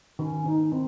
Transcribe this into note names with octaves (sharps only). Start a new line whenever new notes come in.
D#3 C#4
D#3 D#4
D#3 C4